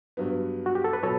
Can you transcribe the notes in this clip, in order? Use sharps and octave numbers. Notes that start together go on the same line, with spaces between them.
G2 F#3 B3
F#4
G4
A4
B4
B2 F#3 A4 C#5